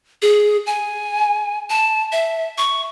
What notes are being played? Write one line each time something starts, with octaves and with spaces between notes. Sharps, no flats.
G#4
G#5
A5
E5
C#6